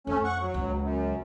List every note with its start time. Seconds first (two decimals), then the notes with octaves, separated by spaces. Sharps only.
0.07 F2 A3 C#4
0.25 F#5 C#6
0.40 F#3
0.54 C#2
0.82 F#2